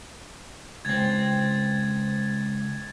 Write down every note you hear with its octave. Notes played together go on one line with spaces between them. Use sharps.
C#2 C4 G#6 A6